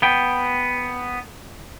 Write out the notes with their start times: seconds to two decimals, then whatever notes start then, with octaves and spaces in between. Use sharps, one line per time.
0.02 B3 G5